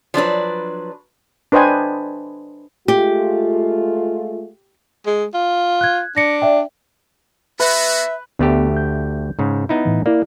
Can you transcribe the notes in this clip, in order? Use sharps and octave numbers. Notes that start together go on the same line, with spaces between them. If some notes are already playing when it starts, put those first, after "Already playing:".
F3 F#3 D4 B4
D4 B4 C5 D#5 G5 G#5
G#3 A3 F4 G4
G#3
F4
F#6 G#6
D4 A#6 C#7
D5 E5 G5
B3 F#4 B4 E5
D2 A3 B3 G4
G6
G#2 C#3
B3 D#4 E4
A2 E3
A#3 E4 D5